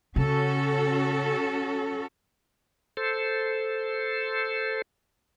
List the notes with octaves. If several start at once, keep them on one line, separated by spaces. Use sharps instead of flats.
C#3 C#4 F#4 A4
A4 C5